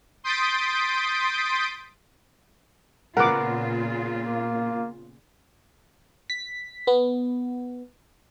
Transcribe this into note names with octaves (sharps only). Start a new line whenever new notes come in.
C6 D#6 G6 A6 B6 D7
A#2 C#3 B3 F4 A#4 F#5 D6
A#3
B6
B3